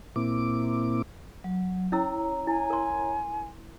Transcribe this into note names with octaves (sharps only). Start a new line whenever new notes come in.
A#2 A#3 C4 E4 D6
F#3
C#4 E4 C#5 A#5 E6
E4 G#5
A#4 C6